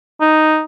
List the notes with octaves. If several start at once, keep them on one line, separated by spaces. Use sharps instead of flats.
D#4